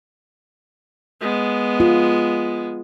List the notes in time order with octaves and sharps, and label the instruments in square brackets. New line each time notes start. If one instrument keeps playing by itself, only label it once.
[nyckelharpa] G#3 B3
[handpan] F4